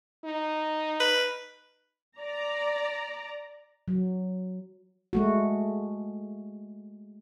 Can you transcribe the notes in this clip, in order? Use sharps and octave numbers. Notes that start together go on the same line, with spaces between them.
D#4
B4
D5 A#5
F#3
G#3 A3 F#4